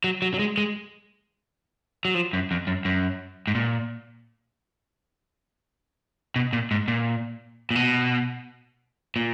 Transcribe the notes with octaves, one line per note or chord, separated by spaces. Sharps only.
F#3
F#3
F#3
G#3
G#3
F#3
F3
F#2
F2
F#2
F#2
G#2
A#2
B2
A#2
G#2
A#2
A#2
B2
A#2